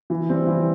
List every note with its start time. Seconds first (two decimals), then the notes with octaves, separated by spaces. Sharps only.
0.10 E3
0.29 G3 C4
0.47 E3